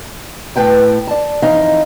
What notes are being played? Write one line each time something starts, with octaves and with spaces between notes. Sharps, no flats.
A2 B4 G5 A5
D5 A5
F2 E3 D#4 D#5 F5